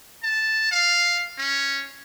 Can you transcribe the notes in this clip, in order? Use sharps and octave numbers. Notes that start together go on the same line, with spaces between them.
A5
F5
C#4